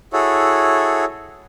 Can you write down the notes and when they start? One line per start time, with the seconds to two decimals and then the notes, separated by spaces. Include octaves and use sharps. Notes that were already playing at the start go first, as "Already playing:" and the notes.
0.13 E4 F#4 G#4 A4 C#5